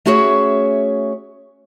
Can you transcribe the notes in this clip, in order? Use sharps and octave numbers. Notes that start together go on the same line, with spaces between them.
A3 C#4 F#4 G#4 C#5 E5